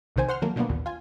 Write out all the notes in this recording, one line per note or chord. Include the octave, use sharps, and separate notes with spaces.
B1 C3 D#3 C5 G#5
C5 F#5 C6 F6
D#3 F#3 A3 A#3
B2 D3 F3 A#3 B3
A1 D#2 A#2
F4 G#5